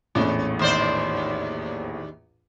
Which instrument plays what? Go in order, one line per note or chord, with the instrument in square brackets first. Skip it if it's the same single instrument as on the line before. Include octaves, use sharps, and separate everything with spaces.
[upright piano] A#1 E2 A2 [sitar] C#4
[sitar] D#2 C5 D5